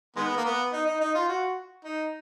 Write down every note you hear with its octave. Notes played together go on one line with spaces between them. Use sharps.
D#3 G#3 B3
A#3
B3
D#4
D#4
D#4
F4
F#4
D#4